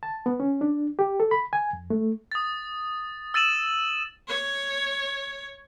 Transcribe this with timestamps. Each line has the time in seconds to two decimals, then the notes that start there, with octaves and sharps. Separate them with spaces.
0.03 A5
0.26 B3
0.40 C#4
0.61 D4
0.99 G4
1.20 A4
1.31 B5
1.53 G#5
1.73 F2
1.90 A3
2.32 D#6 A6
3.34 E6 A6 D#7 E7 F#7
4.28 C#5